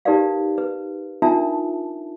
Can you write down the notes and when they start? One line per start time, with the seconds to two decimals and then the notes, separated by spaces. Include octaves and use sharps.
0.05 D#4 G4 A#4 B4 D5 F5
0.58 B4
1.22 D4 D#4 F4 A#4 E5 A5